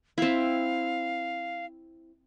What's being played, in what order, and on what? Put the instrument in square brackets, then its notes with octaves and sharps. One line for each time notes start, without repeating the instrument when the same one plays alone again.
[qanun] C4 E4 [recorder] F5